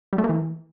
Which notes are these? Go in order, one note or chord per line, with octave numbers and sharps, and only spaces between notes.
G3
A3
A#3
E3